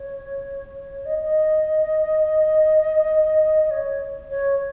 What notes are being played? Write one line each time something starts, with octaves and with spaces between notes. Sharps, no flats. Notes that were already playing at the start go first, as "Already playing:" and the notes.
Already playing: C#5
D#5
D#5
C#5
C#5